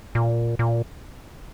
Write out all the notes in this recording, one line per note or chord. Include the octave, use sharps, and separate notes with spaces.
A#2
A#2